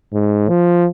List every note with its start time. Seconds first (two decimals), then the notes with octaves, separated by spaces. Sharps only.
0.13 G#2
0.49 F3